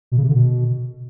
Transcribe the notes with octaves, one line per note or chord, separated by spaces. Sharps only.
B2
C#3
C3
D3
B2